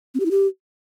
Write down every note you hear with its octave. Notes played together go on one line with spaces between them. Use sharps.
C4
G4
E4
G4